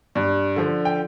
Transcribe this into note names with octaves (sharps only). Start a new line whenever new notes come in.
G2
D3 F3
G5